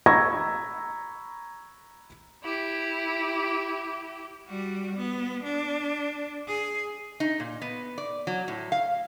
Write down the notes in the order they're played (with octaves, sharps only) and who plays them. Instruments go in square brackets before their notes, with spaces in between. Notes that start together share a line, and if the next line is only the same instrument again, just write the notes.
[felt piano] A#5 B5 C#6 E6 G#6 A#6
[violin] E4 G4
[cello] G3 F#4
B3
D4
G#4
[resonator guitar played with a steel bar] D#4
A#2
B3
D5
F#3
A2
F5